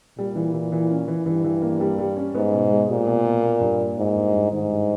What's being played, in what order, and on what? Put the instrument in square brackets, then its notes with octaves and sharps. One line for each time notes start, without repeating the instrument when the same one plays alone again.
[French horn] A#2 [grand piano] G3
[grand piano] E3
E3
E3
C#4
E3
[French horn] G2 [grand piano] E3
[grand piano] E3
A#3
G3
G3
C#4
[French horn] G#2 [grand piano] B3
[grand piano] B2
G#3
[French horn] A#2 [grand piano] G4
[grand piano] B2
B2
A#3
G2
A#3
[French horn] G#2 [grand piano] A#3
[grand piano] G2
G2
[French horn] G#2 [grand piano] D#3
[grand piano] G2